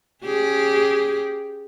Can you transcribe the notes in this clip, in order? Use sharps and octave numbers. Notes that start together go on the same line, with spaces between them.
C#4 G4 G#4